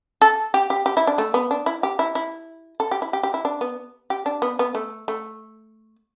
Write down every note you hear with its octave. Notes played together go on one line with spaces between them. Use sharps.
A4
G4
G4
G4
E4
D4
A3
B3
D4
E4
G4
E4
E4
A4
G4
E4
G4
G4
E4
D4
B3
G4
D4
B3
B3
A3
A3